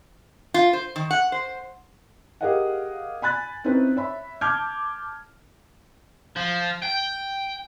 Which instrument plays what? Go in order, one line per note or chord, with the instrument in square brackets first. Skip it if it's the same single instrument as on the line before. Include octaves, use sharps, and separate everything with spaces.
[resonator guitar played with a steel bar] F4
C5
D#3
F#5
C5
[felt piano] G4 G#4 A#4 D#5 F5 F#5
G#5 B5 F#6 A6
C4 C#4 D#4 E4 B4 C5
C#5 E5 B5
A5 D6 F6 G6 G#6
[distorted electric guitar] F3
G5